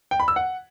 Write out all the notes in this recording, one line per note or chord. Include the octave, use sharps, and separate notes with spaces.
G5
B5
E6
F#5